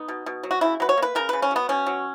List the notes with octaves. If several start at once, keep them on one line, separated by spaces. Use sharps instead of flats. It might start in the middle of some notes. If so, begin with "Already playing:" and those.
Already playing: B3 D#4
B2
B2
F#3
F#4
C#3 E4
F#3 B4
C#5
A#3
B4
C#3 A#4
C#3 B4
C#4
F#3 B3
B2 C#4
F#3